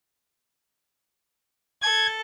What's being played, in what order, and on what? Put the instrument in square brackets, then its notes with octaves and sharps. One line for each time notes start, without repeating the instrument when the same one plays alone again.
[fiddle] A4 [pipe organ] G#6